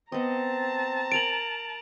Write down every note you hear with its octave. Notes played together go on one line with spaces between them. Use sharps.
B3 C4 D#5 A5 A#5
A#4 G#5 D7 F7 F#7